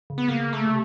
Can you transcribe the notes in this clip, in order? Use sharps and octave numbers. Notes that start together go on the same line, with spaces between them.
C#3
B3
C#3 A#3
A3
C3